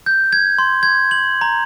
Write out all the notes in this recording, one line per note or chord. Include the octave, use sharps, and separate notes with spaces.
G6
G#6
C6
G#6
F#7
A#5